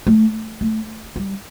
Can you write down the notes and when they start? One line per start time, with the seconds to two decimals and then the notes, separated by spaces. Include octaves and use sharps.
0.07 A3
0.61 A3
1.16 G3